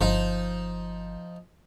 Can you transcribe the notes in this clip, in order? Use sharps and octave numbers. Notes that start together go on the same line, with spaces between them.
G1 F3 D#4